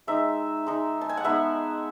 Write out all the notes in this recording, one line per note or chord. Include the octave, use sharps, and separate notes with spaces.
G#3 D#4 E5
G#3 D#4
A5
G#5
F#5
G#3 B3 D#4 E5